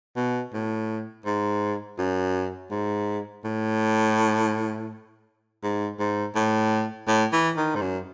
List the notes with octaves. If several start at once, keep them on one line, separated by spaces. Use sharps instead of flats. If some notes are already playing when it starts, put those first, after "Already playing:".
B2
A2
G#2
F#2
G#2
A2
G#2
G#2
A2
A2
E3
D#3
G#2
F#2